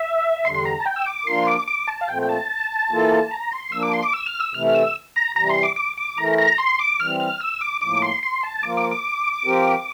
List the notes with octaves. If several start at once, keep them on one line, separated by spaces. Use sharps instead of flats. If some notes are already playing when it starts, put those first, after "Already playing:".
Already playing: E5
E2 D3 G3 D4 C6
C6
A#5
A5
G5
E6
D6
F3 A#3 D4 F4 A#4 C6
D6
D6
A5
F5
A#2 F3 A3 C4 G5
G5
A5
E3 A#3 F4 A4
A#5
C6
F3 A#3 D4 E6
D6
C6
D6
E6
F6
E6
C3 E3 A3 E4 F6
F6
E6
A#5
C3 E3 G3 A#5
C6
D6
D6
D6
E3 A3 E4 A#4 A#5
A#5
C6
D6
E3 G3 C4 F6
F6
E6
D6
A2 F3 A#3 D6
C6
C6
A5
F3 A#3 F4 A#4 D6
D6
D6
F3 C4 G4 A#4